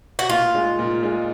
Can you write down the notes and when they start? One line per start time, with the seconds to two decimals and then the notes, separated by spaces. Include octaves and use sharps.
0.19 F#4
0.30 A#2 F4
0.55 G#3 D#4
0.79 A#2
1.03 G#3 D#4